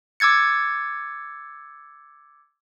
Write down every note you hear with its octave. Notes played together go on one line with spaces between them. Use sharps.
D6 E6 G#6 A6 C#7